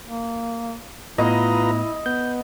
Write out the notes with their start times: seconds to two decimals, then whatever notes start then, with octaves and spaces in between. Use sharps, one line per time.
0.05 A#3
1.18 A2 A3 B3 E4 F4 B4 D#5 A#5
2.06 B3 G6